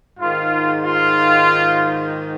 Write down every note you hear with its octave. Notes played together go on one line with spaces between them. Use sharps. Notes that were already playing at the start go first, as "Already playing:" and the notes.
G#2 D#3 F4
F4